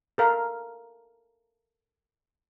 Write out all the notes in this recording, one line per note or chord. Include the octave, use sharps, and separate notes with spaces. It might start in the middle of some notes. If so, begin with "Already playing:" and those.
A4 A#4 F5